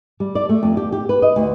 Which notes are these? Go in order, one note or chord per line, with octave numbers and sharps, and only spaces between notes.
G3
D5
A3
F2
G4
G4
B4
D#5
D2